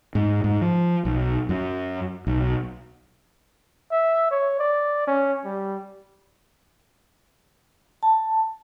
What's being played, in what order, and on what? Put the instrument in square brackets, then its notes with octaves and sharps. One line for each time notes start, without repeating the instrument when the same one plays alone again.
[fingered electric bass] G#2
G#2
F3
B1
F#2
B1
[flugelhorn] E5
C#5
D5
C#4
G3
[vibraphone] A5